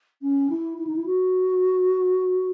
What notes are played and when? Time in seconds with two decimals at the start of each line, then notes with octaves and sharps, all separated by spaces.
0.22 C#4
0.50 E4
0.78 E4
0.87 D#4
0.96 E4
1.06 F#4